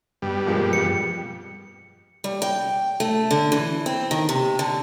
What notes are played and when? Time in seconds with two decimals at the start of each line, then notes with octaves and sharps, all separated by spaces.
0.22 G2 B2 G3
0.47 F3 G#3 A#3
0.73 F2 C#7
2.24 G3
2.42 G5
3.00 A3
3.31 D3
3.52 E3
3.86 C4
4.11 D#3
4.29 C3
4.59 D3